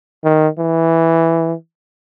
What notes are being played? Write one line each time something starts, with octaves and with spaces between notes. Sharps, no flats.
D#3
E3